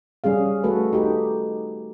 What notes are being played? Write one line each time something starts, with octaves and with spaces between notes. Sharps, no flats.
G3 C#4 G#4 F5
A3 F#4 A4 B4
D#4 G4